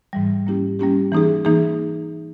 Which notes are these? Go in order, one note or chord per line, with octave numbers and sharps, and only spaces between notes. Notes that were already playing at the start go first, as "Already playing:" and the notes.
G#2 E3 G3
G3 A#3 C#4 E4 G4
G3 A#3 C#4 E4 G4
E3 A#3 D#4 G#4
E3 A#3 D#4 G#4